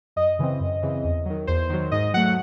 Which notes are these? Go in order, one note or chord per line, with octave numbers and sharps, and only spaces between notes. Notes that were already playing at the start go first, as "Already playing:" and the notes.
F#2 D#5
C#3 E3 C4
F#2
C#3 E3 C4
E2
D#3 F#3
E2 C5
D#3 F#3
G#2 D#5
F#3 A3 F#5